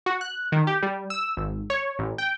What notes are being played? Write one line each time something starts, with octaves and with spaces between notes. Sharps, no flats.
F#4
F#6
D#3
G4
G3
E6
G#1
C#5
A1
G5